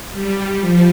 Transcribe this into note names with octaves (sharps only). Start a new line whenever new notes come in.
G3
F3